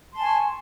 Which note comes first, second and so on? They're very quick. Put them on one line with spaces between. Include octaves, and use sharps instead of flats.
C6 A5 G#5 C#6